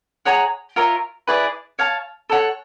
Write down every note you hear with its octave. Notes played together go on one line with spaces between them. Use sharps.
G#4 C#5 F#5 A#5
F4 A#4 C#5 E5
E4 G#4 B4 D5
C#5 F5 A5
A4 C#5 F#5